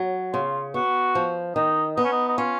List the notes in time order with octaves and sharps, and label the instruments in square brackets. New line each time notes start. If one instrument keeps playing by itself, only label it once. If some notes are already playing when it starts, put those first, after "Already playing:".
Already playing: [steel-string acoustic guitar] F#3
[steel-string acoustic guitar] C#3 [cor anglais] F4
[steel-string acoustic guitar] B3 [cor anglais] F#4
[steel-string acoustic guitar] F3
[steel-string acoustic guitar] D#3 [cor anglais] D#4
[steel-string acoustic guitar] B3 [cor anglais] D#4
[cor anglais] C#4
D#4
D#4
[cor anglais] C#4 [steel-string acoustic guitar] F4